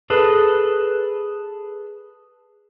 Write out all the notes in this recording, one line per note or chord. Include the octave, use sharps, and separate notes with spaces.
G#4 A4 B4